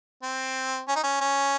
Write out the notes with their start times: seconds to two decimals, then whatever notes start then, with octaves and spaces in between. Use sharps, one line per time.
0.23 C4
0.88 C#4
0.96 D#4
1.03 C#4
1.21 C#4